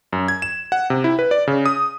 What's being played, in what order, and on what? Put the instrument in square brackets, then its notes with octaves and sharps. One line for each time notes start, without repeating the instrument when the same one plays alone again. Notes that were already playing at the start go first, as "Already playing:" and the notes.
[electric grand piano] F#2
G#6
E7
F#5
C3
E4
B4
D5
C#3
D#6